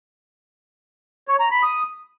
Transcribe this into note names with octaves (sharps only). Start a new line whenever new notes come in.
C#5
A#5
B5
D#6